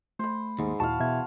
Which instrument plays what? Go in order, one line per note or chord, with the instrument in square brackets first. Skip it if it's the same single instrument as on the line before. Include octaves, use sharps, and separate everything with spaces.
[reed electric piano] A3 [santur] C5 B5
[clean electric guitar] D#2 [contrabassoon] G#2
[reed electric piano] D#2 A#2 E4 [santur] F#4 F5 [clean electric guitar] A5
[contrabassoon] E2 [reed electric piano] B2 E5 G#6